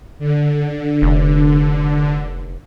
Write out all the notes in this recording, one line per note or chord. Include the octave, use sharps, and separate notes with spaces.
D3
F1